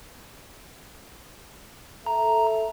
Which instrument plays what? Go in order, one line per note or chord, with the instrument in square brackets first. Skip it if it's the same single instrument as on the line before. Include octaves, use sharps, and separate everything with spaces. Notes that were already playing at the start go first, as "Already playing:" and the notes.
[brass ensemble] A4 E5 [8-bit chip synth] A#5